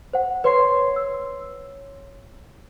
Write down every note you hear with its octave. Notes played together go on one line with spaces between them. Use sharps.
C5 F#5
B4 C#5 C6 C7
E6